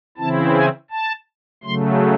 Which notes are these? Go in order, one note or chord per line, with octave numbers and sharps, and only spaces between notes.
C#3 E3 C4 E4 A5
G#5
A5
C#3 F#3 A3 C6